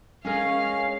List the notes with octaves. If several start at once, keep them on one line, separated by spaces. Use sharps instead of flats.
G#3 C#4 G#4 A#4 F5